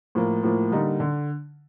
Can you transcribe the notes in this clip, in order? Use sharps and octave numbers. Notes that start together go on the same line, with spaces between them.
A2 F3 A#3
A2 F3 A#3
D3 G3 A#3 D#4
D3